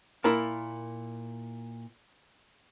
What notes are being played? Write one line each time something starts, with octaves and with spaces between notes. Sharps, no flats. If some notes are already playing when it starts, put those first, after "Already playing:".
A#2 E4 A#4 A5